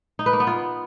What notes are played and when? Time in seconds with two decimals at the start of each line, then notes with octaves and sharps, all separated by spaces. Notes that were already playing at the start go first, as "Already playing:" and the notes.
0.19 D#4
0.26 B4
0.33 A#3
0.40 B3
0.47 F4